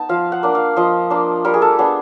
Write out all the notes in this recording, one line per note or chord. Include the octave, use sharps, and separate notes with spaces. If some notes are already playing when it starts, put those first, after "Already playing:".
Already playing: B3 D#4 A5
F3 F5
F#5
A#3 D4
F5
F3 D#5
A#3 D4
G3 A#4
G#4
A4
B3 D4 G#4